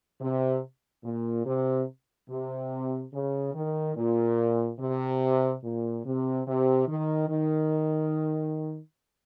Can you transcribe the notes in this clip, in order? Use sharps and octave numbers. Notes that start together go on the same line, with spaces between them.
C3
A#2
C3
C3
C#3
D#3
A#2
C3
A#2
C3
C3
D#3
D#3